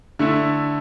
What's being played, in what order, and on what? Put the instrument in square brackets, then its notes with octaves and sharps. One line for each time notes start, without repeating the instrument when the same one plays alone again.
[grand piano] D3 A3 E4